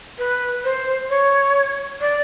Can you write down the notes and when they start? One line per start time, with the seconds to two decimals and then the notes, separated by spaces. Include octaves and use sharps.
0.18 B4
0.64 C5
1.09 C#5
2.01 D5